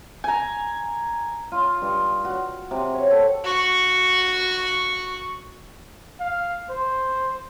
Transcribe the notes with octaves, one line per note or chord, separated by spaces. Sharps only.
G#5 A#5
F4
G2
F#4
C3
C#5
A4
F#4 C#6
F5
C5